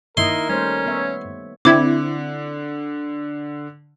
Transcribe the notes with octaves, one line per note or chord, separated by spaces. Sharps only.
D#3 A#3 E4 A#4 D#5 C6
G3 A3 C#4 C5
B3 C#5 E5
D3 C4 E4 D6 G#6